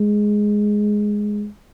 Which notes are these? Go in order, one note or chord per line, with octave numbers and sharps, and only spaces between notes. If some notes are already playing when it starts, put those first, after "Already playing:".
Already playing: G#3